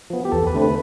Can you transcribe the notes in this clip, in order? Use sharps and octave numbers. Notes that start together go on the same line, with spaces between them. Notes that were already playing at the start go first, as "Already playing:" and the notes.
F3 B3
G4
E2 A4
B4
D3 A3 C4
B4